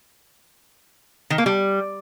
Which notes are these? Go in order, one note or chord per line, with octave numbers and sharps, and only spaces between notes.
D#3
A#3
G3